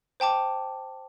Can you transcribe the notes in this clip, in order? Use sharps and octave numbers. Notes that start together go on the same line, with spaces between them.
C5 G5 A5 D6